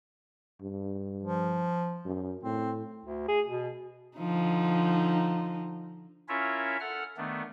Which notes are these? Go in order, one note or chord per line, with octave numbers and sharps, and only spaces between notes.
G2
F3
F#2
A2 C4
D2
G#4
B2
D3 F3 D#4
C#4 E4 F4 A#4 C#5 E5
A4 F#5 F6
D#3 A3 B3 D4